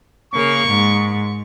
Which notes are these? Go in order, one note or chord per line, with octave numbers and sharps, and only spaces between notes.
C#3 A#3 A#4 C#6
G#2